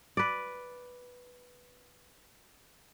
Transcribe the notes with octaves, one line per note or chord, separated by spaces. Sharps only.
B4 D5